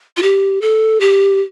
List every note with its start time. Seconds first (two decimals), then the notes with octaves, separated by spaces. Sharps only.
0.17 F4
0.22 G4
0.61 A4
1.00 G4